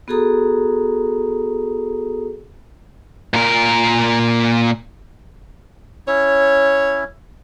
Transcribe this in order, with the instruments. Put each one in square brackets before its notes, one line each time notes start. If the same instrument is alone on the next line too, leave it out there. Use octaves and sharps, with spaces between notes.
[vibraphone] B3 F#4 G#4 A4 A#5 D#6
[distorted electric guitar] A#2 A#4
[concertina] C#4 E4 [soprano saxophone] C#5